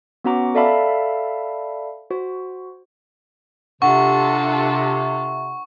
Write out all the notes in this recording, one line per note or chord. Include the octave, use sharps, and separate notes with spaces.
B3 C#4 F#4 F#5 A#5 D6
A4 D5 E5 F5 A5 B5
F#4 C5
C3 D4 F4 A4 F#5 C#6